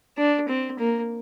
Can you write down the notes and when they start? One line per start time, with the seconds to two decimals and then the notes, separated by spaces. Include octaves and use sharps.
0.18 D4
0.48 C4
0.79 A#3